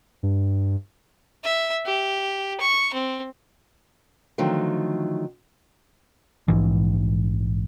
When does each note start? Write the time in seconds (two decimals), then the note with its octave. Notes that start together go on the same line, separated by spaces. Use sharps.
0.23 G2
1.44 E5
1.86 G4
2.60 C#6
2.93 C4
4.38 D3 D#3 F3 F#3 A3
6.48 A#1 G#2 E3